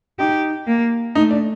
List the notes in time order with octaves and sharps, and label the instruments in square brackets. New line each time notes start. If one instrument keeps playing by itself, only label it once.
[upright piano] D#4 [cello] G4
[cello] A#3
[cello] A3 [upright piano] D#4
[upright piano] D4